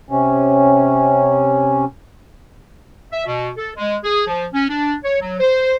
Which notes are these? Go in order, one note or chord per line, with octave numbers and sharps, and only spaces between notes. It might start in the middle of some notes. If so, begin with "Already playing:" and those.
C3 C#4
E5
B2
A4
G#3
G#4
F3
C#4
D4
C#5
F#3
C5